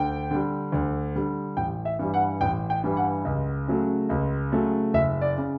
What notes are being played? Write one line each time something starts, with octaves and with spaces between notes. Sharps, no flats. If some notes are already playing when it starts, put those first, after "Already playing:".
Already playing: D2 G5
D3 G3
D2
D3 G3
A1 G5
E5
G2 E3 G3
F#5
A1 G5
G5
G2 E3 G3
F#5
C#2
C#3 F#3 A3
C#2
C#3 F#3 A3
F#1 E5
D5
C#3